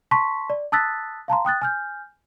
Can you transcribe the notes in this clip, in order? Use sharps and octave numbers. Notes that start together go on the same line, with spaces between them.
A5 C6 C#6 B6
D5
A5 D#6 E6 F#6 A6 B6
F5 A5 A#5 C6
G5 D#6 F#6 A6
G#5 F6 G6